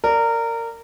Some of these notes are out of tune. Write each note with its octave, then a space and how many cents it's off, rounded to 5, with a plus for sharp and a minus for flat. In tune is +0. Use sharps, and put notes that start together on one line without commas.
A#4 -20 D5 +0